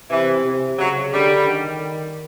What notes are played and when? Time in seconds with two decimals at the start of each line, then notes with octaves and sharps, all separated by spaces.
0.10 C3 E3
0.45 C3
0.79 C#3 F#3
1.14 D3 G3
1.48 D#3